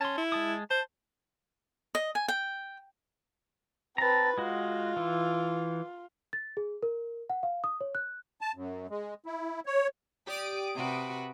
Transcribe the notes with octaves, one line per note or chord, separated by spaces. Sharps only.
C#4 A5 C6
E4
G#3 A5 D#6
C5 A5
D#5
G#5
G5
C4 B4 A5 A#5
G#3 F4 F#4
E3
A6
G#4
A#4
F#5
F5
D#6
C#5
F#6
A5
F#2
G#3
E4
C#5
G4 D5 D#6 D7
C3 F#4 B4